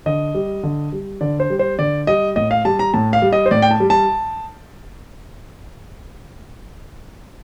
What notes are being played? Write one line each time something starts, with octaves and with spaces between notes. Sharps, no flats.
D3 D#5
G3
D3
G3
D3 D5
C5
G3
C5
D3 D5
G3 D#5
A2 D#5
F5
G3 A5
A#5
A2 A5
F5
G3
D#5
C5
A2 D5
G5
A5
G3
A5